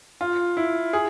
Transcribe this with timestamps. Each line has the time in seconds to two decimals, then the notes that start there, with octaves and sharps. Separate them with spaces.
0.21 F4
0.57 E4
0.93 G#4